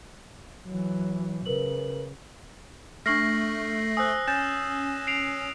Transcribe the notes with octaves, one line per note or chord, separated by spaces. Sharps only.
E3 F#3
C#3 A#4 B4 F#7
A3 D4 C#6 F6 A#6 C7 F#7
C5 G#5 D#6 E6 F#6
C#4 G#5 G6 A6 E7
C7 D7 F7